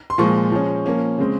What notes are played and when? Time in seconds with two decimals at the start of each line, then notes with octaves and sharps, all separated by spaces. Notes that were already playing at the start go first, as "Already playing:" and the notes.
0.10 C6
0.18 A#2 F3 G#3 C#6
0.52 F3 G#3 C#4
0.86 F3 A#3 C#4
1.18 C#3 G#3 C4